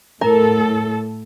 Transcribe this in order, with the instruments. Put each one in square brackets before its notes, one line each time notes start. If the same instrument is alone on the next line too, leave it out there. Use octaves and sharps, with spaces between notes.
[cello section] A2 A4 [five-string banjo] A#4